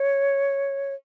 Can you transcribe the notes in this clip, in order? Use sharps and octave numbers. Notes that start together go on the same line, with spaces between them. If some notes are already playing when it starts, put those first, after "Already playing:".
Already playing: C#5